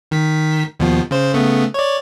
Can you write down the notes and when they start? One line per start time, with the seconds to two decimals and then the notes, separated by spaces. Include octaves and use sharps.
0.11 D#3 B6
0.80 D#2 B2 F3
1.11 C#3 C5
1.34 C#3 A3 B3
1.74 C#5 D5